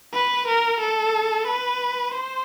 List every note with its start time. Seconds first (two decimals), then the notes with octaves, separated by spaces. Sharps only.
0.13 B4
0.48 A#4
0.80 A4
1.47 B4
2.14 C5